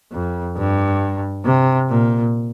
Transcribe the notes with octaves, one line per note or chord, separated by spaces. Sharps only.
F2
G2
C3
A#2